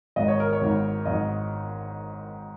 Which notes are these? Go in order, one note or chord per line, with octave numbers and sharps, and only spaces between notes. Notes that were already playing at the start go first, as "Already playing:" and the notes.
G#1 G#2 D#3 D#5
C#5
A#4
C#5
G#1 G#2 D#3
G#1 G#2 D#3 D#5